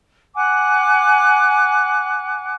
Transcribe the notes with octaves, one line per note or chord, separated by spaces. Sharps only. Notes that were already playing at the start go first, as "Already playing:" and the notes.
F#5 G#5 D6 F#6